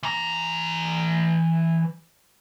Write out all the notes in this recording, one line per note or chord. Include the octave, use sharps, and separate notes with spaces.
E3 A#5